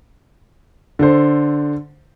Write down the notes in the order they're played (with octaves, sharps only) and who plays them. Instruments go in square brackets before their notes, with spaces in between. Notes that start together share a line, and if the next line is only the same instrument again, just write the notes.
[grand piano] D3 A4 C5